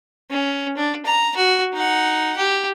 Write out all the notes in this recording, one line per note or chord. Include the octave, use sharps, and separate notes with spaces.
C#4
D4
A#5
F#4
D#4 F#5
G4